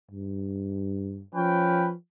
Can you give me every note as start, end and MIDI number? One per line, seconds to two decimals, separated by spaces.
0.11 1.23 43
1.35 1.94 53
1.35 1.89 61
1.35 1.89 71
1.35 1.89 79